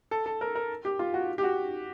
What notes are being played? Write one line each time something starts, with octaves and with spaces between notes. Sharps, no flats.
A4
A4
A#4
A#4
G4
F4
F#4
G4
F#4